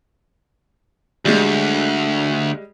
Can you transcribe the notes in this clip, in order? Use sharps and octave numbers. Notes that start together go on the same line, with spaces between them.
D2 G3 G#3